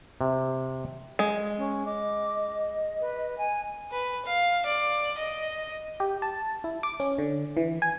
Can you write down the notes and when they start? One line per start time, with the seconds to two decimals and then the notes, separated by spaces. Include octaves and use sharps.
0.21 C3
1.19 G#3
1.57 C#4
1.85 D#5 D6
3.00 B4
3.37 G#5
3.91 B4
4.26 F5
4.65 D5
5.18 D#5
6.00 G4
6.22 A5
6.64 E4
6.83 D6
7.00 C#4
7.18 D3
7.57 E3
7.82 G#5